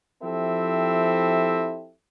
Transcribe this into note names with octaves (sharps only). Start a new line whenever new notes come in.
F3 C4 E4 G4 A4 E5